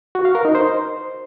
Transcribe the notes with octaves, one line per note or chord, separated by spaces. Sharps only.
F#4
F5
A#4
D#4
C5